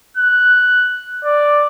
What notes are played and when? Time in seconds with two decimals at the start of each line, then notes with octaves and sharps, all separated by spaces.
0.17 F#6
1.25 D5